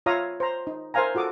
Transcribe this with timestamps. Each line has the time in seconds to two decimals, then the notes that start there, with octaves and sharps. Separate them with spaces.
0.06 F4 C#5 E5 F5 A#5 D#6
0.40 C5 A#5
0.67 D#4
0.94 A#4 C5 E5 F5 G#5 A#5
1.15 F4 F#4 A4 D6 D#6